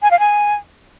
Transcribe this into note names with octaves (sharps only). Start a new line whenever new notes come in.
G#5
F5
G#5